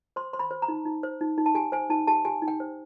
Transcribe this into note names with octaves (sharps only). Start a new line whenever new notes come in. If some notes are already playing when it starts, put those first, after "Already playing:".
C5 C6
C5 C6
B5
C5
A#5
D#4
D#4
C5
D#4
D#4
A5
G4 G#5
C5 G#5
D#4 A5
G4 A5
G4 G#5
D#4
G5
C5